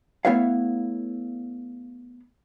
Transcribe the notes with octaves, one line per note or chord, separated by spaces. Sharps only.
A3 B3 E4 B4 C#5 F5